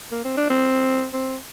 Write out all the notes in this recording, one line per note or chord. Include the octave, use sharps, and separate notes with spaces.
A#3
C4
D4
C4
C4